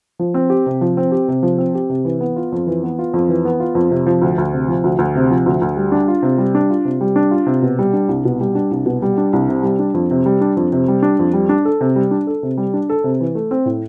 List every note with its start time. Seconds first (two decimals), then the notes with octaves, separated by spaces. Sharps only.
0.19 F3
0.34 C4
0.50 G4
0.66 C3
0.81 F3
0.97 C4
1.12 G4
1.28 C3
1.43 F3
1.58 C4
1.75 G4
1.90 C3
2.05 E3
2.20 B3
2.36 F4
2.52 F2
2.67 E3
2.83 B3
2.99 F4
3.14 F2
3.29 E3
3.45 B3
3.60 F4
3.75 F2
3.91 C3
4.06 F3
4.22 D2
4.38 D2
4.53 C3
4.68 F3
4.84 D2
4.99 D2
5.15 C3
5.30 F3
5.46 D2
5.62 D2
5.77 G3
5.92 D4
6.08 F4
6.23 C3
6.38 G3
6.55 D4
6.70 F4
6.85 C3
7.01 G3
7.16 D4
7.31 F4
7.46 C3
7.62 B2
7.79 G3
7.93 D4
8.08 C2
8.25 B2
8.41 G3
8.55 D4
8.71 C2
8.86 B2
9.02 G3
9.17 D4
9.33 C2
9.49 C3
9.63 G3
9.79 D4
9.94 F2
10.11 C3
10.26 G3
10.41 D4
10.57 F2
10.72 C3
10.88 G3
11.03 D4
11.19 F2
11.33 G3
11.49 D4
11.65 A4
11.81 C3
11.96 G3
12.11 D4
12.27 A4
12.43 C3
12.57 G3
12.74 D4
12.89 A4
13.04 C3
13.20 E3
13.35 A3
13.51 C4
13.66 A2